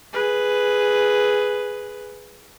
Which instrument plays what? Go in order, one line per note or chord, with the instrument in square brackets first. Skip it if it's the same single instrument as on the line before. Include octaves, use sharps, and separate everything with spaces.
[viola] G#4 B4